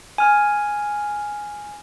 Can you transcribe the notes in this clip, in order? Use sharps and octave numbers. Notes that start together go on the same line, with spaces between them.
G#5 F6